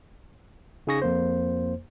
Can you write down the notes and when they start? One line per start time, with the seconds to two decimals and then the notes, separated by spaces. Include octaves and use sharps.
0.87 C#3 D#4 G#4 C#6 A#6
1.02 F2 A#3 C5